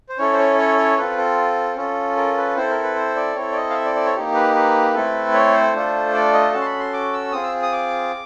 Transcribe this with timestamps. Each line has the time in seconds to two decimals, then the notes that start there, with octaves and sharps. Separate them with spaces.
0.09 C5
0.18 C#4 E4 A4 C#5
0.33 C5
0.38 C#5
0.58 C#5
0.78 C#5
0.97 C4 F4 A4 B4
1.18 A4
1.77 C#4 F4 A4
2.17 A#4
2.37 B4
2.56 C4 E4 A4 C5
2.70 A#4
2.83 B4
2.96 C5
3.16 D5
3.36 C4 E4 A4 C#5
3.52 D5
3.56 D#5
3.70 F5
3.75 E5
3.85 D5
3.95 D5
4.06 C#5
4.16 A#3 D#4 G4
4.34 B4
4.54 B4
4.94 A3 C4 E4 A4
5.34 C#5
5.54 C5
5.74 A3 D4 F4 A4
6.13 D5
6.33 D#5
6.53 C#4 F#4 A4 A5
6.61 C6
6.66 B5
6.80 C6
6.93 D6
7.13 E6
7.32 C4 F4 G#4 D#6
7.43 E6
7.63 D#6
7.72 D6